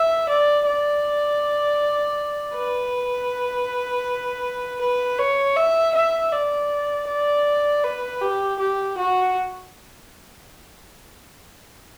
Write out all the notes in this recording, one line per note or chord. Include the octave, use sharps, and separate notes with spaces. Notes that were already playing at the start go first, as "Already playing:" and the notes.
Already playing: E5
D5
D5
B4
B4
C#5
E5
E5
D5
D5
B4
G4
G4
F#4